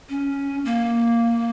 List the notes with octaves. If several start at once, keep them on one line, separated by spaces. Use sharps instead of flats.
C#4
A#3